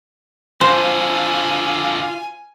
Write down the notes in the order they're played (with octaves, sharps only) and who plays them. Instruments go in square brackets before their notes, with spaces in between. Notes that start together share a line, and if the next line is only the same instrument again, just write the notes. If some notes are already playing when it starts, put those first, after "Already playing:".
[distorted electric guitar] F2 D3 [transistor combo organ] F4 [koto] C5 [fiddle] G#5